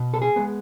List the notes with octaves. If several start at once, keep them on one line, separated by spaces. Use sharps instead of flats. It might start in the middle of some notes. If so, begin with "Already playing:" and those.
Already playing: B2
A4
G#4
G#3 B3